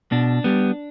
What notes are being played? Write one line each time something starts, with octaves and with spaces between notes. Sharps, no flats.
B2 D4
G3 B3